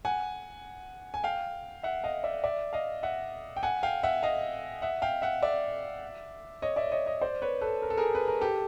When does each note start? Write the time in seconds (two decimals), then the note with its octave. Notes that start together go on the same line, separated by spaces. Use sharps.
0.05 F#5 G#5
1.14 G#5
1.24 F5 G5
1.83 E5 F#5
2.04 D#5 F5
2.24 D5 E5
2.44 D5 E5
2.73 D#5 F5
3.03 E5 F#5
3.56 G5
3.63 F#5 G#5
3.83 F5 G5
4.03 E5 F#5
4.23 D#5 F5
4.82 E5 F#5
5.02 F5 G5
5.22 E5 F#5
5.42 D5 E5
6.62 C#5 D#5
6.76 D5 E5
6.92 C#5 D#5
7.06 C#5 D#5
7.21 C5 D5
7.42 B4 C#5
7.61 A4 B4
7.82 A#4
7.90 A4
7.97 G#4 A#4
8.15 B4
8.28 A#4
8.41 G4 A4